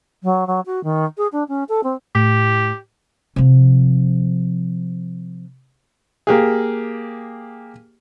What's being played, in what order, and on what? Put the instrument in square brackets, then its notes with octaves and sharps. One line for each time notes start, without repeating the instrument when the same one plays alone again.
[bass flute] F#3
F#3
F#4
D#3
G#4
D4
C#4
A4
C4
[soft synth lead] A2 [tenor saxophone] G4
[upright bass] C3 F3
[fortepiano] A#3 G4 G#4